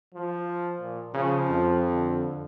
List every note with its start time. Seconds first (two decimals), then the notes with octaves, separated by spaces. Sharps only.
0.14 F3
0.81 A#2
1.14 C#3 F3
1.48 F2
1.88 D3